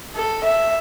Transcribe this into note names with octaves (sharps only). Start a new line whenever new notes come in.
A4
E5